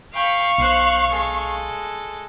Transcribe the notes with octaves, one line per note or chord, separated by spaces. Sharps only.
F5 G5 B5 C#6
B1 C5 F#6
G#3 A4